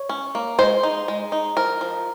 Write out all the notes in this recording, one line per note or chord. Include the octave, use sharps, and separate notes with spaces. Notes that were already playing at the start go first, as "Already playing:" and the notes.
Already playing: C#5
C#4
A#3
G#3 C5
D#4
G#3
D#4
F3 A#4
F3